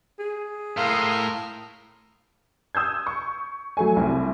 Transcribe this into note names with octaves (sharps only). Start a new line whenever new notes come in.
G#4
A2 A#4 F5 C6 D#6 F6
D#6 E6 G6 G#6
C#6
F#3 A3 G#5
C2 C4